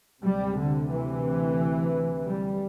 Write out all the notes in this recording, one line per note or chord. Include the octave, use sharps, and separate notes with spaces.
D2 C3 G3
D3
E3
G3